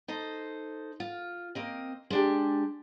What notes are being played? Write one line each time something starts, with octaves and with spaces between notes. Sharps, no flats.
D#4 A4 C5
F4
A#3 C4 D#5
G#3 D4 G4